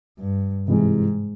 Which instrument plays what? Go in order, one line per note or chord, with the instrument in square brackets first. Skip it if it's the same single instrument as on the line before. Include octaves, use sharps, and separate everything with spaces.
[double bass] G2
[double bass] G#2 [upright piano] C3 E3 G#3